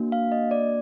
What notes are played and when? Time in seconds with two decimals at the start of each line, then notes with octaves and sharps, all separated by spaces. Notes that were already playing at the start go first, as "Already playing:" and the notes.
Already playing: A#3 D4 F#4
0.12 F5
0.32 D#5
0.51 D5